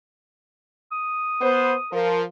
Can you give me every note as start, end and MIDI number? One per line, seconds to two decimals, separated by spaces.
0.91 1.93 87
1.41 1.73 59
1.41 1.73 72
1.91 2.21 53
1.91 2.21 70